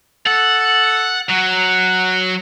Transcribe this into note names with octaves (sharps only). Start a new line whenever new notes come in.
A4 F#5
F#3 F#5